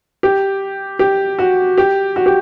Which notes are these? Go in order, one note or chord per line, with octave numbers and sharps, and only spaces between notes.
G4
G4
F#4
G4
F#4
G4